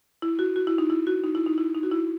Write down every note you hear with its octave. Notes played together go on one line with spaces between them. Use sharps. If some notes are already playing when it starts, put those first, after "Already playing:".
E4
F#4
F#4
E4
D#4
E4
F#4
D#4
E4
D#4
E4
D#4
F#4
E4